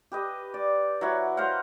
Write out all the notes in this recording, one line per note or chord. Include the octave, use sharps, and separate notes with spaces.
G4 B4 D#5
D5
F#3 E4 C#5 F#5
A#4 C5 F5 F#5